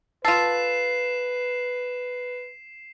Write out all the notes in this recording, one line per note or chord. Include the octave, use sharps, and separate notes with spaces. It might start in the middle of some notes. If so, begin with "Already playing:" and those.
F4 A4 B4 C7 E7